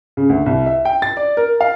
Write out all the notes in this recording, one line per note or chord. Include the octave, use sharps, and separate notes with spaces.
C#3
D2
C2
E5
G5
A6
D5
A#4
F5